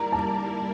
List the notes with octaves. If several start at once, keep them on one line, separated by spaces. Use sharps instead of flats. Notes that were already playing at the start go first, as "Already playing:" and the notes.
Already playing: G3 A#3 E4 A#4 D5 A#5
A5